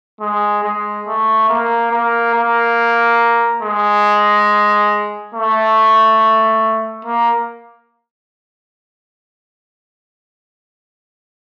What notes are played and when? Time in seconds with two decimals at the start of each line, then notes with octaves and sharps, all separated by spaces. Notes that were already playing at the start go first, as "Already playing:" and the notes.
0.21 G#3
0.64 G#3
1.07 A3
1.49 A#3
1.92 A#3
2.34 A#3
3.63 G#3
5.35 A3
7.05 A#3